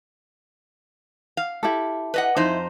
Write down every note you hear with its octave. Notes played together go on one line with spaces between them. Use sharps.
F5
E4 G4 A4
B4 D#5 F#5
F2 D#4 E4 C5